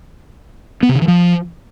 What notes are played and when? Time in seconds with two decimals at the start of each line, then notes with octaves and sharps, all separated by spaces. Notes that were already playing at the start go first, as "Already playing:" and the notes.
0.83 B3
0.89 C3
0.95 D3
1.02 E3
1.08 F3